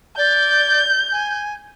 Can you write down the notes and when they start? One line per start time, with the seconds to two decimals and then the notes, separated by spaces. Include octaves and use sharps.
0.18 D5 G6
1.12 G#5